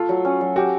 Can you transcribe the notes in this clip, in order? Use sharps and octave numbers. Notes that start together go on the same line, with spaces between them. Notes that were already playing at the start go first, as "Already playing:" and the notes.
Already playing: A3 F4
F#3
C#4
F#3
F#4 G4